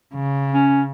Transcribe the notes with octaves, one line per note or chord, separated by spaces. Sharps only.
C#3
C#4